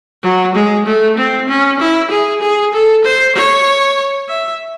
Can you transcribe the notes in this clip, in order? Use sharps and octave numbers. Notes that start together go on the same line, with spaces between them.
F#3
G#3
A3
C4
C#4
E4
G#4
G#4
A4
C5
C#5
E5